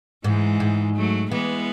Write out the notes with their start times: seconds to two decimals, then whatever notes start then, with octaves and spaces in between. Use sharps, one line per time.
0.24 G#2 E3 G#3
0.60 G#2
0.96 F#3 A3
1.31 E3 G#3 B3